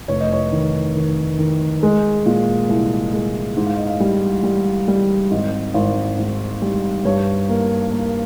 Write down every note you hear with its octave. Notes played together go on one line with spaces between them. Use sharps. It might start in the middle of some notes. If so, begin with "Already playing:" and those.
F1 C#5
D#5
C#5
D#3
D#3
D#3
G#3
A#2
C2
G#3
G#2
F5
D#5
F5
G3
G3
G3
G#1 D#5
G#1
G#2
G3
G2 C#5
A#3
A#3